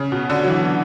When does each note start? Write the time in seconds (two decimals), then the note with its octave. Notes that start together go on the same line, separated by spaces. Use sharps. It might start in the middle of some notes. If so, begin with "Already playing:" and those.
Already playing: C#3
0.12 B2
0.30 D3
0.44 F#3
0.48 E3